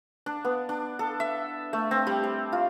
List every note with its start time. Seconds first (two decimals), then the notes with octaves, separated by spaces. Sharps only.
0.26 D4
0.45 B3
0.69 D4
0.99 A4
1.20 E5
1.73 A3
1.91 C4
2.07 G3
2.24 C5
2.53 F4